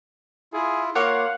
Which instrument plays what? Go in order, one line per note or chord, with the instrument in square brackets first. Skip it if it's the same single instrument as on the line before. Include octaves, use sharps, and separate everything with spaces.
[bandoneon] E4 F4 [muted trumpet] G#4
[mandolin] A#3 C#5 [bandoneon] F4 [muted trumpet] F5 [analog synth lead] F#5